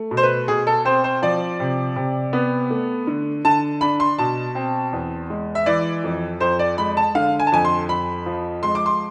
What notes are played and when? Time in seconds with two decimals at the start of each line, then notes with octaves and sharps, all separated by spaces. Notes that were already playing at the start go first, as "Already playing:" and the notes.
Already playing: A3
0.11 B2
0.17 C5
0.23 B4
0.48 B2 G#4
0.67 A4
0.85 C4 C5
1.04 C5
1.22 F3 D5
1.60 C3
1.96 C3
2.33 B3
2.70 A3
3.07 D3
3.45 D3 A5
3.81 D4 B5
4.00 C6
4.19 B2 A5
4.55 C4
4.92 E2
5.30 G#3
5.55 E5
5.66 E3 D5
6.04 F2
6.40 F2 C5
6.59 D5
6.78 G#3 B5
6.97 A5
7.15 D3 F5
7.40 G#5
7.47 A5
7.52 F2 G#5
7.65 C6
7.89 F2 B5
8.26 F3
8.63 G#3 C6
8.75 D6
8.86 C6